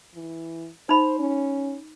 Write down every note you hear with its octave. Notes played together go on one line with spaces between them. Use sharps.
E3
D#4 C5 B5
C#4